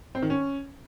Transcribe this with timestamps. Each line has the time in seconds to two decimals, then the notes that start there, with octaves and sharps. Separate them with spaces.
0.15 C4
0.22 D#3
0.30 C#4